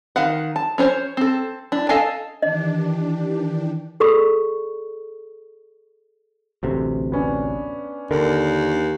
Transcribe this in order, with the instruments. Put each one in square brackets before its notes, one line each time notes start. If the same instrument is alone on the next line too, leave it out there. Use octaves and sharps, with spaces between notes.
[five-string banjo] D#3 F5 F#5
A5
C#4 D4 C5 C#5
C4 A4
D4 E4
A4 D#5 F5 G#5 A5
[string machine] D#3 E3 G4 [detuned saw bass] D4 [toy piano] D#5
[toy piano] G#4 A4 D5 B5 C#6
[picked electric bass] A1 D2 C3
[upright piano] B3 C#4 D4
[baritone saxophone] D#2 [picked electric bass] D3 [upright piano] A#4